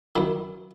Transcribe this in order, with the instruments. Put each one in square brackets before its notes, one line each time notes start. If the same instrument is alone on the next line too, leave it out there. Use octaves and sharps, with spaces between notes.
[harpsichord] F#2 D#3 E4